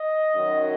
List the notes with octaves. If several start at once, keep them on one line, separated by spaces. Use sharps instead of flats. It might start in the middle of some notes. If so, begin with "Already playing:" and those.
Already playing: D#5
F#2 D#3 F#3